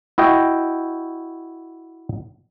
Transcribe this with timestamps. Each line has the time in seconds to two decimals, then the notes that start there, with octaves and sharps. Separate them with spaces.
0.18 E4 F#4 D#5 G5